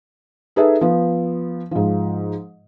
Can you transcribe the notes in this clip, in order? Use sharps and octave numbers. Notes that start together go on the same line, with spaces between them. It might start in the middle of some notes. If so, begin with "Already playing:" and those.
D#4 G#4 A4 B4 E5
F3 B3
G#2 F3